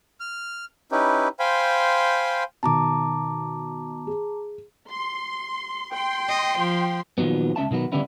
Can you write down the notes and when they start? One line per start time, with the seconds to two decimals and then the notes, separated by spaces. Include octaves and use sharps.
0.20 F6
0.92 C#4 D#4 E4 G4 B4
1.39 C5 F5 G5 G#5 B5 C6
2.63 B2 D#3 A5 A#5 D6
4.07 G#4
4.91 C6
5.93 G5 C6
6.29 D#5
6.59 F3
7.18 A#2 D#3 F3 F#3 B3
7.56 C#2 C#4 E5 A5
7.71 B2 D#3 F#3 B3
7.92 D3 G3 B3 C#4 E4